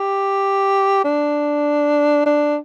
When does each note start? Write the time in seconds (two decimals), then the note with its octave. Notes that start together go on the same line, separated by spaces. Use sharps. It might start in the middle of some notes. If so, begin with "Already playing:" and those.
Already playing: G4
1.04 D4
2.26 D4